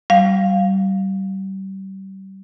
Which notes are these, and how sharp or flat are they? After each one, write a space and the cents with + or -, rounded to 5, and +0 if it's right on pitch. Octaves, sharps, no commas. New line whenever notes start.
G3 -30 F5 +0